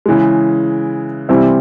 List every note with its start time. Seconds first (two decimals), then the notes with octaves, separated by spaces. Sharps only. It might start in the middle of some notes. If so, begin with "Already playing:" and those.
0.06 C#3 E3 G#3
1.29 C3 E3 G3 C4 E4